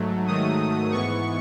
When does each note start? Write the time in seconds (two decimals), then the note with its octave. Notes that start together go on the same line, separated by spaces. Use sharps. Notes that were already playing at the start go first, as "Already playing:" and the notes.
Already playing: G#2 F#3 A3
0.26 G#2 D#3 F#3 A3 D#6
0.92 G#2 E3 B3 C#6